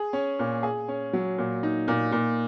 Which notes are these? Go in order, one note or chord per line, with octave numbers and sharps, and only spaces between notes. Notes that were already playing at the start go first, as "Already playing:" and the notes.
Already playing: G#4
C#4
A#2
G#4
C#4
F#3
A#2
D#4
A#2
A#2